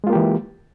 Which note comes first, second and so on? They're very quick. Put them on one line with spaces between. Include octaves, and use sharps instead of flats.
G#3 F4 A#3 G4 E3